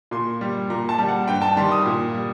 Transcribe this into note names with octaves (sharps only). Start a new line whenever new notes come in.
A#2 C6
G3
A#2 A#5
A5
G3
F#5
G2 G5
A5
D#3 G3 C6
D#6
A#2
G3